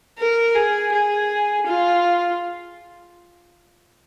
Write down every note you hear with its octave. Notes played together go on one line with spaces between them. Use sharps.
A#4
G#4
G#4
F4